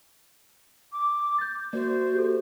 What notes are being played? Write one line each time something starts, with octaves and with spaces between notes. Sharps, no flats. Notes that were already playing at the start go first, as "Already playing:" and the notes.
D6
G6 A6
A#3 F#4 C5 D5
G4 A4